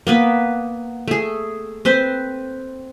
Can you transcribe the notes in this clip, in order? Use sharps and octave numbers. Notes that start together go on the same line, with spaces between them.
A#3 B3 B4
A3 G#4
C4 B4 C5